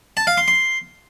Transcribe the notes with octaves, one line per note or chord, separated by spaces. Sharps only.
A5
F5
C6
C6